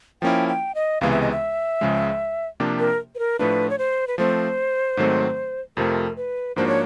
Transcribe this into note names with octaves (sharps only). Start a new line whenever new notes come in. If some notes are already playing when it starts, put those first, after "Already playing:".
F3 A#3 C#4 E4 G5
G5
D#5
C#2 C3 E3 G#3 B3 F5
E5
D#5
E5
C#2 C#3 F3 G#3
C3 F3 A#3 D4 G4
A#4
B4
A#4
A2 F3 A3 D4 F4 B4
C#5
C5
B4
F3 A3 C4 C5
G#2 D#3 F#3 A3 C4
F2 C3 F3 A3 A#4
B4
G#2 F3 A#3 D4 F#4 C5
C#5